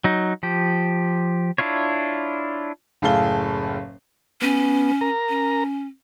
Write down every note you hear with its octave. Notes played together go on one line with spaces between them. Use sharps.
F#3 D#4
F3 G4
D4 E4 F4 C#5
F#1 A2 G#4 A4 F5 G7
B3 C#4
A#4 A#5
C#4